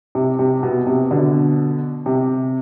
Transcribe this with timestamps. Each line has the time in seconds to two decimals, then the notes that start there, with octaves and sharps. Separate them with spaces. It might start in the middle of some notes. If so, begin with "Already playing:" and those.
0.15 C3
0.39 C3
0.63 B2
0.87 C3
1.11 B2 D3
2.06 C3